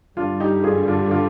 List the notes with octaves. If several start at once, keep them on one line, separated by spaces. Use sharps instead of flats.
G2 D3 G3 D4 F4
D#4 G4
F4 G#4
D4 F4
D4 F4